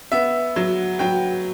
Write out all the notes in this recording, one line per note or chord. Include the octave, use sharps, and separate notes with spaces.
B3 E5
F#3
F#3 G5